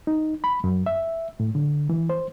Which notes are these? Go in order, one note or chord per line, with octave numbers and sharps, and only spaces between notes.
D#4
B5
F#2
E5
A2
D3
E3
C5